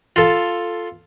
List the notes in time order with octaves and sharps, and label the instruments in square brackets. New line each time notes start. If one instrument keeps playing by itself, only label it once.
[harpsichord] F4 A4